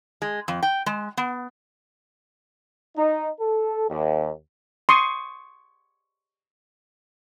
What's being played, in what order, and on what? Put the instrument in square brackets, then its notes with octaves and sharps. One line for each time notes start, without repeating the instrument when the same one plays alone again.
[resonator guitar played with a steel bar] G#3
F2
G5
G#3
B3
[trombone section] D#4
A4
D#2
[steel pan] C6 C#6 D#6